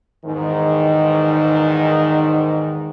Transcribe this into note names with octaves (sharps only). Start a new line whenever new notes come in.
E2 G#2 D#3